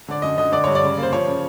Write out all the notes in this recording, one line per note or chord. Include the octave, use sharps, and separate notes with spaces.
D3 D5
F#2 D#5
D3 D#5
D3 D5
G2 C#5
D5
C#3
A#3 C5
F3 C#5
C#3